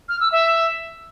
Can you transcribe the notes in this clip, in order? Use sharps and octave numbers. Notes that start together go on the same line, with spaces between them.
F6
E6
E5